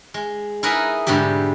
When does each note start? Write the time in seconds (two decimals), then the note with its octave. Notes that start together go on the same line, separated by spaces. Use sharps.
0.14 G#3
0.63 D#4 E4 G#4 A#4 B4 D#5
1.07 G#2 B2 D3 G3 G4